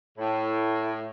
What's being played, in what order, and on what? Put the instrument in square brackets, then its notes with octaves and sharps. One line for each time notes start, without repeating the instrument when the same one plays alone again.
[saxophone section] A2